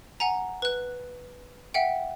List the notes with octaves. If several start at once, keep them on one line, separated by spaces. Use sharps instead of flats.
F#5 G#5 A#5
B4 F#6
E5 F#5 G5